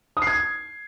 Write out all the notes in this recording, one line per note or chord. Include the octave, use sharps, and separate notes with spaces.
D#6
C7
G#6